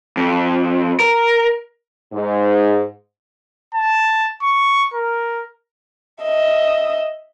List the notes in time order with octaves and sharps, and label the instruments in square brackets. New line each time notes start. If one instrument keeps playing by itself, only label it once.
[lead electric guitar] F2
A#4
[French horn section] G#2
[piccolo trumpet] A5
C#6
A#4
[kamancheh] D#5 E5